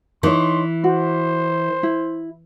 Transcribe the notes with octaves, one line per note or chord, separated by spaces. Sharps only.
E3 D#4 C#5 C6
F#4 C5
E4